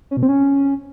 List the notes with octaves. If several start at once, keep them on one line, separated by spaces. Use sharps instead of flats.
C#4
B2
C4
C#4